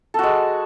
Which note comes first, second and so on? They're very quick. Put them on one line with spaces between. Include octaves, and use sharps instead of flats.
A4 F#4 G#3